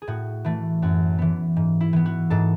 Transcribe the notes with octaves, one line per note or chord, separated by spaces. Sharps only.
G#4
A2 F#4
E3 A3
F#2 F#4
E3 B3
G#2
E4
E3 B3
F#4
G#2 A4